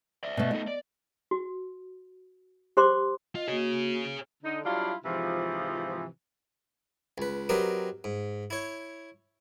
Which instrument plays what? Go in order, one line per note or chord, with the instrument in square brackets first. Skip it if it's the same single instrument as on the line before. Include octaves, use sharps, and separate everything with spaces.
[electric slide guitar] D5 E5
[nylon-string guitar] B2 A3
[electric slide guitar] A3 D#4 A4 [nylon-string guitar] D#5
[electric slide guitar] D5
[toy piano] F#4
G4 C5 C6 D6
[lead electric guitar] F4 [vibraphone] D#5
[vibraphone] A#3 F#4 [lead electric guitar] G#4 C#5
[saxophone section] D3 D#4
F#3 G3 D4 E4 F4 F5
G#2 C3 E3 F3
[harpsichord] C#2 B4
F#3 C4 G4 A#4 B4 D#5
G#2
E4 C#5